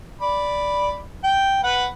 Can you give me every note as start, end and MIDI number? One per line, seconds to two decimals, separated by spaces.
0.21 0.97 74
0.21 0.97 83
1.24 1.63 79
1.64 1.87 71
1.64 1.87 78